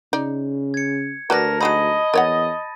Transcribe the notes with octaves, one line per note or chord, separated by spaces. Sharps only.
C#3 D#4 D5
G#6 C#7
D2 F#4 A#4 B4 D5 A5 A#6
F#3 G#3 D#4 D#5 B5 D#6 D#7
E2 A#4 C#5 F#5 A6